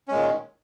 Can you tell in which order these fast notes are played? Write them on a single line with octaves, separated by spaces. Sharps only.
C#4 G#3 A#2 D#3